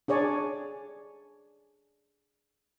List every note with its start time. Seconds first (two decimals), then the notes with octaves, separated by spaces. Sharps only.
0.08 D4 G#4 C#5 D5 G#5